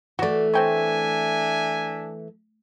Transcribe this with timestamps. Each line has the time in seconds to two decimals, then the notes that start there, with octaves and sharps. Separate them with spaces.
0.19 E3 A3 F#4 D5
0.54 C4 D4 E5 G5 G#5 C#6